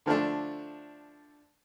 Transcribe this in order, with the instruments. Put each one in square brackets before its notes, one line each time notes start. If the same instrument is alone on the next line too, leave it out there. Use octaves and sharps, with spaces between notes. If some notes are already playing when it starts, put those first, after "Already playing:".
[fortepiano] D3 F3 A3 D4